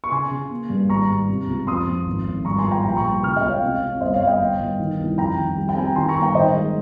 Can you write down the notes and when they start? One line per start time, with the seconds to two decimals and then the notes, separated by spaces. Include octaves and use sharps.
0.04 C#6
0.11 C#3 G#5 C6
0.31 C#3
0.50 A#3
0.70 G2
0.90 G#1 A#5 C#6
1.09 G3
1.29 C3
1.48 C#2
1.67 F2 C6 D#6
1.87 F2
2.06 G#1
2.27 G#1
2.45 G2 A#5 C#6
2.59 G#5 C6
2.64 F3
2.71 G5 A#5
2.84 A#1 G5 A#5
2.97 A#5 C#6
3.04 G3
3.23 C#3 C#6 F6
3.36 D#5 G5
3.42 C#2
3.49 C#5 F5
3.62 C3
3.81 C3
4.01 G1 C5 D#5
4.14 C#5 F5
4.20 G1
4.27 D#5 G5
4.40 G1
4.60 G1
4.79 D#3
4.99 C2
5.18 F2 G5 A#5
5.37 D#3
5.57 G3
5.69 G5
5.76 C4 G#5
5.87 A#5
5.95 D#3 G#5 C6
6.09 A#5 C#6
6.15 G1
6.22 G5 A#5
6.35 D#3 C5 D#5
6.55 G#3